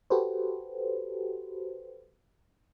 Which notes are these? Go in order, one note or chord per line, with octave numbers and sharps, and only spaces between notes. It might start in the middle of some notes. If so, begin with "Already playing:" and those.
F#4 G4 A4 B4 C5